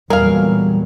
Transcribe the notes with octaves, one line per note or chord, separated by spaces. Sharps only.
E2 A#2 F#3 G3 G#4 A#4 F5